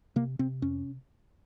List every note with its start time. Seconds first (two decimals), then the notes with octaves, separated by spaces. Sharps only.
0.16 C3 A#3
0.39 C3 C4
0.62 F2 C#4